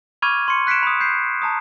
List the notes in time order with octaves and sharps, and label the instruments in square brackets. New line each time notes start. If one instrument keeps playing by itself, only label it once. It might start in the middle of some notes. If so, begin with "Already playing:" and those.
[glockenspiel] B5 C#6 D6 F6 G#6 D#7
C6 C#6 C#7
F#6 B6 C#7 D7 E7
B5 D#6
G6 C7
A5 A#5 D#6